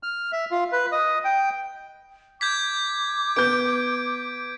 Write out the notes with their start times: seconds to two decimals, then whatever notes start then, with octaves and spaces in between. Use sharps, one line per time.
0.03 F6
0.32 E5
0.51 F4
0.73 B4
0.92 D#5
1.25 G5
2.41 D6 G6 G#6 B6
3.36 B3 G6 D7